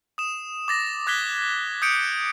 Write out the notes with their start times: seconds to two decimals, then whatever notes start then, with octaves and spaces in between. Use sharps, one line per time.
0.18 D#6 E7
0.68 D6 A6 A#6
1.07 D6 F#6 G#6 A#6 B6 G7
1.82 D#6 G6 C#7 D7